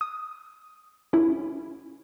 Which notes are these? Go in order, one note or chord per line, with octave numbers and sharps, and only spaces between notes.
D#6
C#4 E4